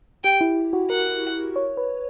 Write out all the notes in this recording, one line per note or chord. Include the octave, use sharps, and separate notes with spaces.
G4 G5
E4
F#4
A#4 F#5
C#5
B4